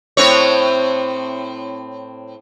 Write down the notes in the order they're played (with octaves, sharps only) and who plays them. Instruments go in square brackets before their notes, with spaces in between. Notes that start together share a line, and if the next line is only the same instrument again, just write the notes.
[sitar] A2 C4 C#5